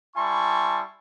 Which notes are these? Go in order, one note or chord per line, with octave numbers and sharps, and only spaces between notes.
G3 E4 G#5 A5 C6 C#6